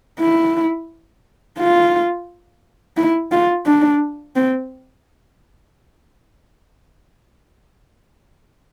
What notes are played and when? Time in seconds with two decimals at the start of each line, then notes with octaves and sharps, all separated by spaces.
0.19 E4
1.58 F4
2.97 E4
3.32 F4
3.66 D4
4.36 C4